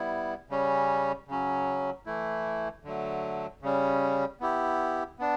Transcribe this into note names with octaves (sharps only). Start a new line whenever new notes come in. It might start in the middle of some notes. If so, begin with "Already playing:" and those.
Already playing: G3 B3 E4
C#3 G3 C#4
C#3 F#3 C#4
E3 A3 E4
D3 F#3 A3
C#3 G3 C#4
B3 E4 G4
B3 D4